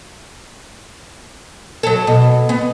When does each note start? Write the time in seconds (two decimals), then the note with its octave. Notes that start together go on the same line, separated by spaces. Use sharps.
1.83 F#3 A4
2.07 B2
2.49 B3